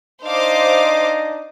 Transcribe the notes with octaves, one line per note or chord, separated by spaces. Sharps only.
D4 D#4 C5 D#5 F5 D6